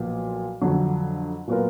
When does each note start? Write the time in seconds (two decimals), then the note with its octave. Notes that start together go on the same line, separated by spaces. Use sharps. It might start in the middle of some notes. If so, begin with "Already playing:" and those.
Already playing: B1 A#2 F3 B3 F4
0.61 F2 D3 F#3
1.47 A#2 F#3 B3 F4 A#4